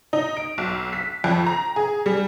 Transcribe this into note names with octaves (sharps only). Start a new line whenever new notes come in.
D#4
D7
B1
B6
F2
A#5
G#4
G3